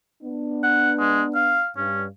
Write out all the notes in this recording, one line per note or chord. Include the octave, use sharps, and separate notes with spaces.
B3 D4
F#5
G#3
F5
G2 C#4